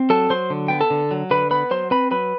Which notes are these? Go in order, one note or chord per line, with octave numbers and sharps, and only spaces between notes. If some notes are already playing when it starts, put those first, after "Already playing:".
Already playing: C4
F#3 A4 A5
F#3 C5 C6
D3
B3 G5
A4 A5
D3
F#3
D3 B4 B5
B3 B4 B5
F#3 C5 C6
C4 B4 B5
F#3 B4 B5